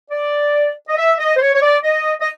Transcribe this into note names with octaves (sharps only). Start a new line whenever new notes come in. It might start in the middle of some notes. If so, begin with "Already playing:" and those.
D5
D#5
E5
D#5
C5
C#5
C#5
D5
D#5
D#5